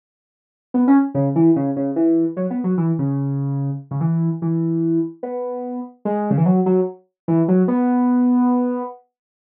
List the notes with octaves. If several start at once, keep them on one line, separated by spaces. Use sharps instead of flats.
B3
C#4
C#3
E3
C#3
C#3
E3
F#3
B3
F#3
E3
C#3
C#3
E3
E3
B3
G#3
C#3
E3
F#3
F#3
E3
F#3
B3